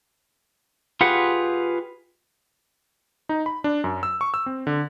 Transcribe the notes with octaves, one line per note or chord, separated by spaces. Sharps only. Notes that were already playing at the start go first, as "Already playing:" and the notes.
F4 G4 G#4 B4 F#5
D#4
B5
D4
F#2
E6
C#6
E6
C4
D3